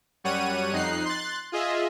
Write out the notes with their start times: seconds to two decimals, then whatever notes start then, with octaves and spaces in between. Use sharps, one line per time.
0.24 F#2 G3 C#5 F#5 D#7
0.72 F2 D#4 F#6 C7
1.05 C6 F#6 A6
1.52 F4 G#4 D#5 E5